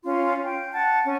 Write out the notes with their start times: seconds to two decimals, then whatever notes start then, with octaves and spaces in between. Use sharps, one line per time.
0.04 C#4 F4 C6
0.43 G5
0.72 F#5 A5
1.03 C#4